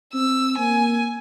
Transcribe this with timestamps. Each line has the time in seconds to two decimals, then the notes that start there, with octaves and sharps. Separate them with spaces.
0.14 C4 E6
0.58 A#3 G#5